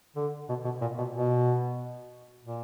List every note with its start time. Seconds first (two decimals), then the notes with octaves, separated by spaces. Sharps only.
0.16 D3
0.49 B2
0.64 B2
0.81 A#2
0.98 B2
1.14 B2
2.45 A#2